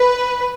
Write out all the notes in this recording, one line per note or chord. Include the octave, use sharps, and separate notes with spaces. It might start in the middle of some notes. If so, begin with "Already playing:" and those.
Already playing: B4